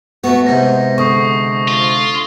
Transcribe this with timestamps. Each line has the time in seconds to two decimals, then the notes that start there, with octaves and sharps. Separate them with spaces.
0.24 A3 B3 F#4
0.47 G#2 C3 A#6
0.98 D3 C#6 D#6 C7
1.68 F4